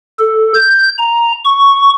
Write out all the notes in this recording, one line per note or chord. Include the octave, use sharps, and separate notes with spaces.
A4
G6
A#5
C#6